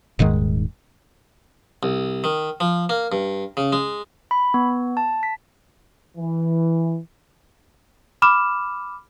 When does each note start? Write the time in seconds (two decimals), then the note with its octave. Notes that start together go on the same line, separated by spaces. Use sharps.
0.19 D#1 G#2 D#3 G#3
1.83 C2
2.24 D#3
2.60 F3
2.89 A#3
3.12 G2
3.57 C#3
3.73 G#3
4.31 B5
4.54 B3
4.97 A5
5.23 B6
6.18 E3
8.22 B5 D6 F6 E7